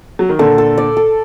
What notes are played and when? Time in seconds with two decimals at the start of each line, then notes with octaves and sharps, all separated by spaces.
0.19 F#3
0.29 D#3
0.39 A#2 D3 A4
0.58 A4
0.78 D5
0.97 A4